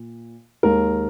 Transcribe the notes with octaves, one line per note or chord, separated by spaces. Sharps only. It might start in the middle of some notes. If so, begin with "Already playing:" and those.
Already playing: A#2
D#2 D#3 G#3 A#4